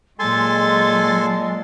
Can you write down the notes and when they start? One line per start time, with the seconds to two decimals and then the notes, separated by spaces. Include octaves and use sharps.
0.19 A#2 F#3 G#3 A4 G#5 C6 A6